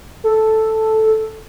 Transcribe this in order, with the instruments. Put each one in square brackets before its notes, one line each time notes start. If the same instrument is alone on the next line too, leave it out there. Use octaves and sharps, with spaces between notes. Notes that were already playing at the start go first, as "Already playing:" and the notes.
[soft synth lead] A4